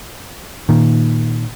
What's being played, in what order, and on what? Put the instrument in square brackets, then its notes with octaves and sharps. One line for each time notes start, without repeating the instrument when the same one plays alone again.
[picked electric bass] A#2 D#3